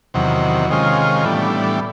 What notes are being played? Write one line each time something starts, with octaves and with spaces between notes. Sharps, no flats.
E2 C3 D#3 F#3
C3 D#3 G#3 C#4 F4
A2 E3 G3 B3 D4